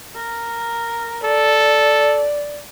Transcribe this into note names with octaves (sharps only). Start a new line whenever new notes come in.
A#4
A4 D5